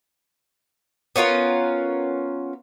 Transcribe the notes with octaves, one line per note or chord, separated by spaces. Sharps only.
B3 C#4 F4 A#4